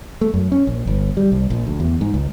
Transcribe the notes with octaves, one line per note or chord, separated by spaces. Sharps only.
A3
F#2
C#4
A#1
G1
G3
C2
A#1
D2
E2
G#2
C#2